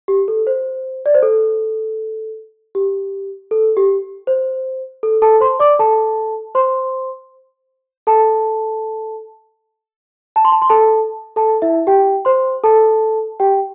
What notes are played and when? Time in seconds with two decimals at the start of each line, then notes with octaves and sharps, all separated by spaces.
0.08 G4
0.28 A4
0.47 C5
1.06 D5
1.15 C5
1.23 A4
2.75 G4
3.51 A4
3.77 G4
4.27 C5
5.03 A4
5.22 A4 A5
5.41 C5 C6
5.60 D5 D6
5.79 A4 A5
6.55 C5 C6
8.07 A4 A5
10.36 A5
10.45 C6
10.52 A5
10.62 C6
10.69 A4 A5
11.36 A4 A5
11.62 E4 E5
11.87 G4 G5
12.25 C5 C6
12.64 A4 A5
13.40 G4 G5